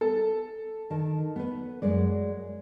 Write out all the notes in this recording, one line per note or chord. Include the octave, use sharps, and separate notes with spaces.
A4
D#3 A5
B3 B4
F#2 G#3 D5